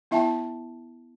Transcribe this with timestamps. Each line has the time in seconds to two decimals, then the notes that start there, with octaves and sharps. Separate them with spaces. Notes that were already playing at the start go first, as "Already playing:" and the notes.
0.11 B3 E4 E5 G5 A5